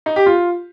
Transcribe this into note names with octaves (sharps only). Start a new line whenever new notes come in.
D#4
G4
F4